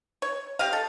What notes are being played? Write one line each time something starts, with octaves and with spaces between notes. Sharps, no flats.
C#5
G4 D#5 F5
A4